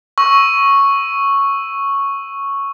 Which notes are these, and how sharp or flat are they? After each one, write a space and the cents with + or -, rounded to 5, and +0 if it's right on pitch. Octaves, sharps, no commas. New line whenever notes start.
C#6 +0 E6 +0